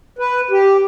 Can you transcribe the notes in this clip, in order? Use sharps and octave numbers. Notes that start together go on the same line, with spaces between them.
B4
G4